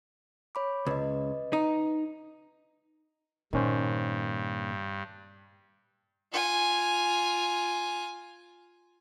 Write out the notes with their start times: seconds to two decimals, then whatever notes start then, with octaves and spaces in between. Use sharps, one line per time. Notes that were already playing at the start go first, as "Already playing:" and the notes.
0.55 C#5 B5 D6
0.86 C#2 B4 D#5
1.53 D#4
3.53 G2 A#2 D#3 C#4 C5
6.33 F4 G#5